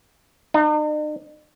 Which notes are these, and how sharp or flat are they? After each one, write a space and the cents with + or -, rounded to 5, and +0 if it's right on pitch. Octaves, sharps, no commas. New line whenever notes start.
D#4 -45